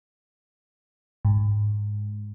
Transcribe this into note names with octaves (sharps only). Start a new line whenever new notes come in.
G#2